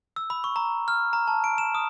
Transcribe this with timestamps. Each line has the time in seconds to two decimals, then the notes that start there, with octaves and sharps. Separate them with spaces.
0.16 E6
0.30 B5
0.44 C#6
0.56 A#5
0.88 F6
1.13 A#5
1.28 A5
1.44 D7
1.58 E7
1.75 D#6